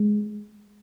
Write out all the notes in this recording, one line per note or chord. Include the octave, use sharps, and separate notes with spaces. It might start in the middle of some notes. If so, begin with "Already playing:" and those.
Already playing: G#3